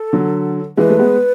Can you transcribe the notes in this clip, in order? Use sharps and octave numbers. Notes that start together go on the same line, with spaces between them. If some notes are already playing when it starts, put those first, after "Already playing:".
Already playing: A4
D3 F#3
E3 G#3 B4
A3
G#3 B3